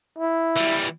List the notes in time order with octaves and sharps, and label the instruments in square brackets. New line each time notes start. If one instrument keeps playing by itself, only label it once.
[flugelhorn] E4
[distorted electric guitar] E3 G3